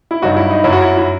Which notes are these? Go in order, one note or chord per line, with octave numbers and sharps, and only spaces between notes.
E4
G2 F#3 D#4 F#4
E4
D#4
F#2 F#3 E4
F#4
E4
E4